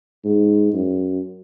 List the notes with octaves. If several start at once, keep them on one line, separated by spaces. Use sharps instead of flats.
G#2
F#2